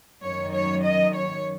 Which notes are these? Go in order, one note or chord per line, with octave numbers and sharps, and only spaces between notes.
F#2 D#3 F#3 C#5
C#5
D#5
C#5